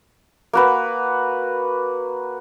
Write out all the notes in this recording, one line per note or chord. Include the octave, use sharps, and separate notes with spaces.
A#3 F#4 B4